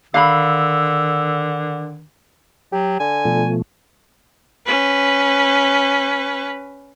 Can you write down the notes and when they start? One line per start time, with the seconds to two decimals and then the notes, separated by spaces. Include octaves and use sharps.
0.14 D3 D#3 F5 B5 E6
2.72 F#3 G4
3.00 D3 G#5
3.25 B2 F3 A3
4.66 C#4 B4